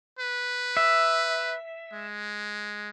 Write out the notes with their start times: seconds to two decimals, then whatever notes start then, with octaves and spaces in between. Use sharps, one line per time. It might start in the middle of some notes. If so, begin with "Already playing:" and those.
0.19 B4
0.77 E5
1.93 G#3